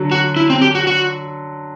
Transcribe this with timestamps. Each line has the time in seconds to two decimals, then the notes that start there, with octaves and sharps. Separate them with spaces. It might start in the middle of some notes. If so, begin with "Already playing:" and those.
Already playing: D3 F#3
0.11 F#4
0.36 E4
0.50 C4
0.62 G4
0.75 F#4
0.87 F#4